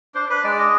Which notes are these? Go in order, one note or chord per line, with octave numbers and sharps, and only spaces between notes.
D4 C5
D4 B4
G#3 D5
D4 D#5